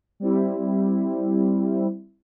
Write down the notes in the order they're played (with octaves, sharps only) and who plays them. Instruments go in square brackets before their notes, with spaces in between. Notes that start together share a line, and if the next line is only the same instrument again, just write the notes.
[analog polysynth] G3 C4 E4